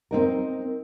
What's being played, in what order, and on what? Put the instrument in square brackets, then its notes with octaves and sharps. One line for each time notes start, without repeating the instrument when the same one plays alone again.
[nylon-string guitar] C4 D#4 A#4